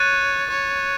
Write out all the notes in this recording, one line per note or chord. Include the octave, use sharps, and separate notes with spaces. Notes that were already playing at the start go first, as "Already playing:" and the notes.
Already playing: C#5 F#6 A6 D#7
C#5